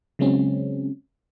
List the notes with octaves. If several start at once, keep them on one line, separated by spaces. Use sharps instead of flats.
C#3 F#3 G#3 C4 C#4